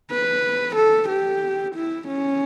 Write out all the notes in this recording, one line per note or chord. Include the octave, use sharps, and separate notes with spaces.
B4
A4
G4
E4
C#4